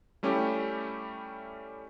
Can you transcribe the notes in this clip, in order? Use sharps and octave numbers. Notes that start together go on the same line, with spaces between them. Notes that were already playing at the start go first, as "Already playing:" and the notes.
G3 A3 C#4 E4 G4